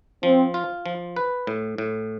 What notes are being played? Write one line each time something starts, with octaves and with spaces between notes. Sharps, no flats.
F3 C4
F4
F3
B4
A2
A2